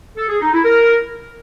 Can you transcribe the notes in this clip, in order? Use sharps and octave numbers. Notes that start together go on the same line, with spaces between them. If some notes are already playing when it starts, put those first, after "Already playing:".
A4
G#4
D#4
E4
A#4